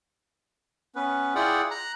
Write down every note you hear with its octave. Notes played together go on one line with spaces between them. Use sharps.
B3 C#4 B4
E4 F4 G#4 D5 F#5 G5
A#5 F#6